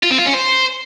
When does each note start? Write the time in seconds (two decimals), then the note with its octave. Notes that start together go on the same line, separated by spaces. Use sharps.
0.03 F4
0.11 C4
0.18 F4
0.26 C#4
0.34 C5